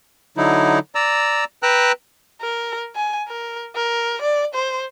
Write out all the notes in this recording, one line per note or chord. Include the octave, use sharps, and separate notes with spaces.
D3 F#3 D#4 E4
D5 A#5 E6
B4 G5 A#5 E6 F#6
A#4
G#5
A#4
A#4
D5
C5